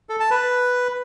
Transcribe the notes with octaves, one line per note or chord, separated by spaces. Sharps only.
A4
A5
B4